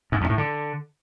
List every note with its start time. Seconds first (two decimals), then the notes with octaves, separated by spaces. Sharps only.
0.12 G#2
0.21 F2
0.29 A2
0.38 D3